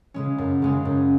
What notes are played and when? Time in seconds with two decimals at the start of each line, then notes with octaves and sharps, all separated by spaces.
0.14 C#3 G#3 C#4
0.38 F#2
0.62 C#3 G#3 C#4
0.85 F#2